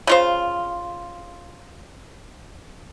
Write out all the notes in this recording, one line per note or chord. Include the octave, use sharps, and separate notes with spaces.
C#3 F4 C5